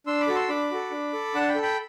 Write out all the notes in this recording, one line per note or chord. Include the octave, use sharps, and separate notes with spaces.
D4 C6 E6
B5 D6
F#4 A4
C6 E6
D4 B5 D6
F#4 A4
D4
A4
D4 F#5 A5
G5 B5
A4
G5 B5